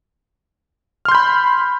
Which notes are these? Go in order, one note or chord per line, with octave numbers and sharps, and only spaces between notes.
B5 C6 F6 G6